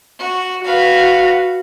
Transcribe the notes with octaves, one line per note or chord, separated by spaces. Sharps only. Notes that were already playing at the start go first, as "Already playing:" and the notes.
F#4
F#4 B4 F5